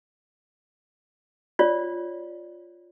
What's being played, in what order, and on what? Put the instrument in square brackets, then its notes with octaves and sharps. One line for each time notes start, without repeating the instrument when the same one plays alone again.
[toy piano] F4 C#5 D5